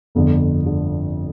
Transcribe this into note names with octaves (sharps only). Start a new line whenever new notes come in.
G1 F2 D3
D3